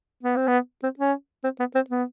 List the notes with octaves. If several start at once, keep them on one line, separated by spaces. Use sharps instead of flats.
B3
C4
B3
C4
C#4
C4
B3
C4
B3